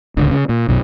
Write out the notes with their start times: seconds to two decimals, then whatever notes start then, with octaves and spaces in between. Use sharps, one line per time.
0.17 D1 C#2 D3
0.31 C#3
0.49 A#2
0.68 B1 F#2 B2